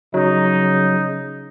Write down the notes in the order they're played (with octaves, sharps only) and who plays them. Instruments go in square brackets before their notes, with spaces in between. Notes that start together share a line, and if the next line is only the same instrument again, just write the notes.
[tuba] C#3 [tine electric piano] F#3 [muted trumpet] D#4